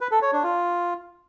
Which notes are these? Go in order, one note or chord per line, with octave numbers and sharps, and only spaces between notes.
B4
A4
C#5
D4
F4